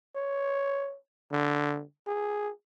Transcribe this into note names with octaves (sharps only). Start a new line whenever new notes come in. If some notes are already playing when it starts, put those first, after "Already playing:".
C#5
D3
G#4